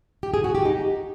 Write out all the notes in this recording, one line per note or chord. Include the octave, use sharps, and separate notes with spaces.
G4
G#4
F#4
G4
D#4